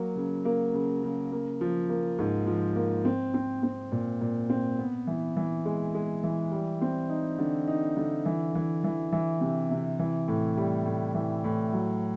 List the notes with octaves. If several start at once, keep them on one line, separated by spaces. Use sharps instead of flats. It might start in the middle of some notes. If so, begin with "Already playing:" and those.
Already playing: F#3 A#3
C#3
A#3
C#3
C#3
A#3
F3
A#3
G#2
F3
A#3
C4
C4
C4
A#2
A#2
C4
B3
E3
E3
G#3
G#3
E3
G3
C4
D#4
D3
D#4
D3
E3
E3
E3
E3
C3
C3
E3
A2
G3
A2
E3
A2
F#3